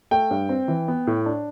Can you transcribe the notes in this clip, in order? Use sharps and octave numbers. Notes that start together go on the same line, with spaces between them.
A3 G5
G2
C4
E3
B3
A2
D4